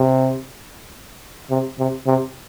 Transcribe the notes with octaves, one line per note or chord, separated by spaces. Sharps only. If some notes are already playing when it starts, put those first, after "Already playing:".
Already playing: C3
C3
C3
C3